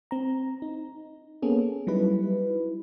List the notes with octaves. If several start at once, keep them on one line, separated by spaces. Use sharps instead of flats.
C4 A#5
D#4
A#3 B3 C#4 G#4 A4
F#3 G3 D#4 E4 B4